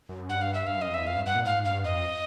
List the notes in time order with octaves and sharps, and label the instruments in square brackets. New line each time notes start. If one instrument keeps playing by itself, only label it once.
[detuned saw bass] F#2
[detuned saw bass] G2 [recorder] F#5
[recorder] F5
E5
[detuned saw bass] G2 [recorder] F5
[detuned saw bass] F#2 [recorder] D#5
[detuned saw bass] F2
[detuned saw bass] E2 [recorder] E5
[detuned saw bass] F2 [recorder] F5
[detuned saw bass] G2
[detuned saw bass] G2 [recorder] F#5
[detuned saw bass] A#2
[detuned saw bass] G#2 [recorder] F5
[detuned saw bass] G2 [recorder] F5
[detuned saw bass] F2 [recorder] D#5